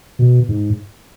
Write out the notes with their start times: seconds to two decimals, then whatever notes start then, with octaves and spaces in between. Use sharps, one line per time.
0.19 B2
0.49 G#2